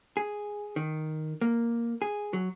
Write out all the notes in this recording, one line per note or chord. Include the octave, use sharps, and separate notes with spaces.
G#4
D#3
A#3
G#4
F#3